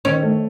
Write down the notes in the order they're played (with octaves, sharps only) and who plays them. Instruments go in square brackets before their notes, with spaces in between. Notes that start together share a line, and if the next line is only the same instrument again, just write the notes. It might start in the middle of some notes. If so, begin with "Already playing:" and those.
[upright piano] D#3 [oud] C#4
[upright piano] A3